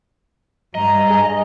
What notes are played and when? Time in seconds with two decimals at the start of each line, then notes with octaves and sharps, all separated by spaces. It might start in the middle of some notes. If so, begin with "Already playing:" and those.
0.75 G2 D#5 A#5
1.09 G#4